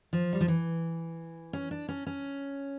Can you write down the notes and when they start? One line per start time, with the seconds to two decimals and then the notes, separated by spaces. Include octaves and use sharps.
0.13 F3
0.33 G3
0.41 F3
0.48 E3
1.53 C#4
1.71 D4
1.89 C#4
2.07 C#4